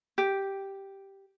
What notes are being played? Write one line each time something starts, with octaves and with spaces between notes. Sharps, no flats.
G4